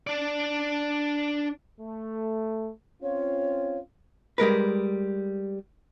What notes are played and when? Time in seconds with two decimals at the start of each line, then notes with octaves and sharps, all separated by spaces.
0.07 D4 D5
1.80 A3
3.02 C4 C#4 F4 C#5
4.38 G3 G#3 A#4 B4